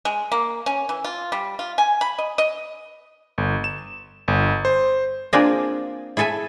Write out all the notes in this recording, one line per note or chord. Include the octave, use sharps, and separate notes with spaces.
G#3
A#3
C#4
E3
F4
G3
F4
G#5
B5
D#5
D#5
G1
E7
G1
C5
A#3 C4 D4 F4 G#4 A#4
E4 G#4 A4 E5 G#5